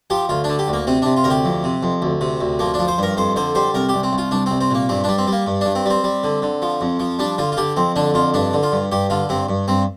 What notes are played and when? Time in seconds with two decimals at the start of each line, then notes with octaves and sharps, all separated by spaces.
0.10 F3 G4
0.29 D2 F4
0.44 D4
0.49 D3
0.59 G4
0.68 D2
0.73 A#3
0.87 C3 C4
1.02 C3 D4
1.16 F4
1.24 D2 A#4
1.30 G4
1.45 F2
1.64 C3
1.83 F2
2.02 D2
2.21 C3
2.41 D2
2.59 F3 A#3
2.74 D4
2.79 F3
2.88 C5
2.98 G2 A#4
3.17 F2 C5
3.36 D3 C5
3.55 G3 C5
3.74 C2 A#4
3.89 G4
3.94 C2
4.03 C4
4.13 C2
4.18 F4
4.31 C2 D4
4.46 C2 C4
4.61 C4
4.71 A#2 A#3
4.89 G2 C4
5.04 G3 D4
5.18 C4
5.27 G3
5.32 A#3
5.47 G2
5.61 G2 D4
5.75 C4
5.85 G3 C4
6.04 G3
6.24 D3
6.42 D3
6.62 F3
6.81 F2
7.00 F3
7.19 G3 D4
7.38 D3 F4
7.52 F4
7.57 D3 G4
7.76 F2 C4
7.96 D3 D4
8.14 F2 F4
8.34 G2 D4
8.53 D3
8.63 F4
8.72 G2
8.92 G2 G4
9.10 D3 F4
9.29 G2 C4
9.49 G2
9.68 G2 C4